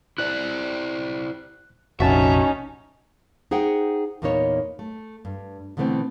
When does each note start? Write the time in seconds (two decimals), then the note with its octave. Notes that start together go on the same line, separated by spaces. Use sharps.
0.18 E4 C5 D5 F#6
2.00 F1 A#1 C#4 D#4 F#4 E5 A5
3.51 D#4 G#4 C5 F#5 G5
4.22 E2 A#2 A#3 B3 D#4 C#5
4.79 A3
5.25 G2
5.77 B2 D3 E3 A3 B3 C4